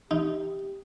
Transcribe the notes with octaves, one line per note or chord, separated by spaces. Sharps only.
D#4 G4